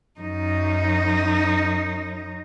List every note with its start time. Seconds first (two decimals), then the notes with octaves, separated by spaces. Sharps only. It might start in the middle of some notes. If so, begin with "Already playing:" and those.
0.21 F#2 D#4